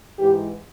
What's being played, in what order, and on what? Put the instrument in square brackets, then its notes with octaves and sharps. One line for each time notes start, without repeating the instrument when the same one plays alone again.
[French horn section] G#2 E3 G4